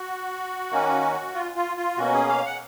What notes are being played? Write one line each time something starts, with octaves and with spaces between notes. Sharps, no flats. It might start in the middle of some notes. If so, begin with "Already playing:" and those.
Already playing: F#4
D#3 A#3 C#4
F4
F4
F4
B2 A#3 C#4 F#4
G#4
F5
F#5